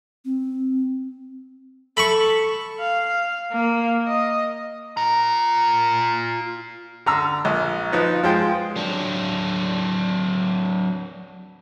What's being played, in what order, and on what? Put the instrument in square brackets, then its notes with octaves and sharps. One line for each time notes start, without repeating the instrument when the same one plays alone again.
[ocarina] C4
[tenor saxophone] A4 [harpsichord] B5 C#6
[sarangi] F5
A#3
D#5
[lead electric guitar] F4 A#5
[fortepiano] D3 A#5 E6
A#1
F3 D#4 B4
F3 G#3 G5
[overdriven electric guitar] F#3 D4